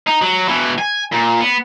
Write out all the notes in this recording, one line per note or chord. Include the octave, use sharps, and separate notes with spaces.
D#4
F#3
B2 E3
G#5
A#2
B3